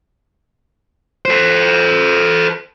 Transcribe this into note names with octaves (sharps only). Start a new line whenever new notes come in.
A4 C5